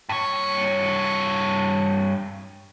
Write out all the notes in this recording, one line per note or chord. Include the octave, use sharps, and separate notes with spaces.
G2 C#5